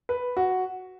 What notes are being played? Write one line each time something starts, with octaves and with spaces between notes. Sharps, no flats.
B4
F#4